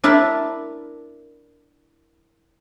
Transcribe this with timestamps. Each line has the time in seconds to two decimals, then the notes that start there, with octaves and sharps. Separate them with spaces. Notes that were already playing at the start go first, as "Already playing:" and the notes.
0.04 D4 E4 A#4 E5 A5